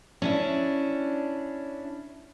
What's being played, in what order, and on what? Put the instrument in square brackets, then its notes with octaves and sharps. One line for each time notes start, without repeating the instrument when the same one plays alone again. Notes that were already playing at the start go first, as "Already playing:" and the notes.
[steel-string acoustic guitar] C#4 D4 E4